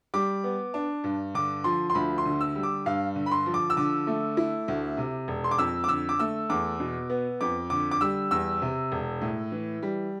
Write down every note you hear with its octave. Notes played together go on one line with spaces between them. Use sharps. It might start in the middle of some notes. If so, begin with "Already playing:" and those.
G3 D6
B3
D4
G2
D3 D6
F3 C6
C6
D2 B5
C6
D3
E6
G3
D6
G2 F5
D3
B5
C6
F3
D6
E6
D3 D6
A3
E4
D2
C3
E1
C6
D6
F2 E6
D6
D3 E6
D6
A3 E6
E2 D6
B2
B3
F2 D6
D3 D6
D6
G3 E6
E2 E6
C3
E1
A2
E3
G3